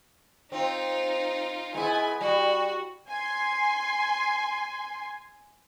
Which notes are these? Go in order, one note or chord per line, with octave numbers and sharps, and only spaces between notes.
C4 D#4 F4
G#3 B3 E4 G#5
G3 F#4
G#5 C6